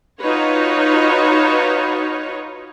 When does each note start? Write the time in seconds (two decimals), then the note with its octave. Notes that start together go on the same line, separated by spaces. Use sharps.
0.20 D#4 F4 F#4 B4 C#5